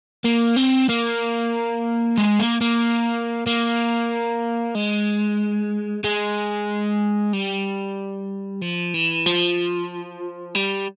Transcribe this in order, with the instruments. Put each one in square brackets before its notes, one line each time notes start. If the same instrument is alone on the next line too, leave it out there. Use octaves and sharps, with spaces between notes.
[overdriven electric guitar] A#3
C4
A#3
G#3
A#3
A#3
A#3
G#3
G#3
G3
F3
E3
F3
G3